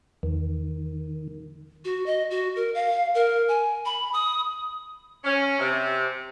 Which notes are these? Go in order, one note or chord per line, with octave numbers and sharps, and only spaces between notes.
E2 D#3
F#4
D#5
F#4
A#4
F5
A#4
G#5
B5
D#6
C#4
C3